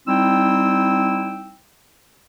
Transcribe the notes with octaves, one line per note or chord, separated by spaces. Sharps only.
G3 C4 D#4 E4 G5 E6